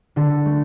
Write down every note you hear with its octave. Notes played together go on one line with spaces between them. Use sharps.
D3 A4
A3